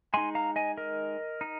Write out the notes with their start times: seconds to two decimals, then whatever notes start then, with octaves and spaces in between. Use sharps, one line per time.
0.14 G#3 D#4 G#5 C6
0.35 F5 A#5
0.56 D#5 G#5
0.78 A#4 D#5
1.41 D#4